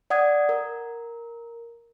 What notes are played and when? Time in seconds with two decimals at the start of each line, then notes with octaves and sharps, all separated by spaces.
0.10 D5 F#5 D#6 G#6
0.49 A#4